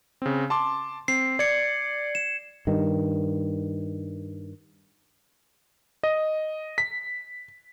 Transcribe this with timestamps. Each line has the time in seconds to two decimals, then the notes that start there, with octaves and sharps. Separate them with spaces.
0.22 C#3 C4
0.50 A5 C6 D6
1.08 C4 C7
1.39 D5 G#6 C#7
2.15 E7
2.67 G2 D#3
6.03 D#5
6.78 B6